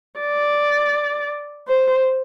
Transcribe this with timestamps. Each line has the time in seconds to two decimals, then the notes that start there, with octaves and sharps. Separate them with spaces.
0.20 D5
1.68 C5